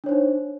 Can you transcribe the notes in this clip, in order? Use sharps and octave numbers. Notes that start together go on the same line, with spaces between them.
D4 D#4 C5 C#5